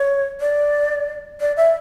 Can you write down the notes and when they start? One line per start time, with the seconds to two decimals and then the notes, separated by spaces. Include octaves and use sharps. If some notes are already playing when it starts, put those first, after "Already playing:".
Already playing: C#5
0.40 D5
1.41 D5
1.57 E5